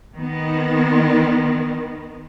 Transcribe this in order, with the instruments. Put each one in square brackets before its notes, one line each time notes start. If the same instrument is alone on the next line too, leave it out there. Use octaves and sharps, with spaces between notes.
[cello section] D#3 B3